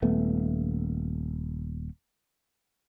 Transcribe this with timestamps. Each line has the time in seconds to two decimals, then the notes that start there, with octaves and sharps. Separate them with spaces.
0.02 D#1 A3 B3